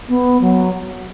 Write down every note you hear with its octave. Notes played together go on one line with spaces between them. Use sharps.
B3
F#3